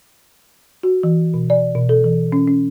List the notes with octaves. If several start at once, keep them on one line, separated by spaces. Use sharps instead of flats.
F#4
E3
B2
D5
B2
A4
E3
C#4
C#4